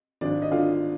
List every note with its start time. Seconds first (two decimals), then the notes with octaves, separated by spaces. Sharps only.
0.21 G#1 D4 D5
0.42 D#5
0.52 D3 F4 F5